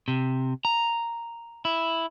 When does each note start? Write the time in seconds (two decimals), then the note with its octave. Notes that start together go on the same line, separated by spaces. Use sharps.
0.08 C3
0.65 A#5
1.65 E4